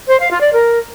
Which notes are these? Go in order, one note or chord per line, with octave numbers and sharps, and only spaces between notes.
C5
F5
F4
D5
A#4